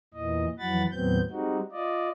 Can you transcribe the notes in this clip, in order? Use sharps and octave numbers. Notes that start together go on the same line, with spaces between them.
E2 A#2 E3 D#5
F2 E3 F#3 F#5 B5 A6
D#2 A2 F#3 B3 C4 G6
G3 G#3 C4 D#4 F#4
F4 D5 D#5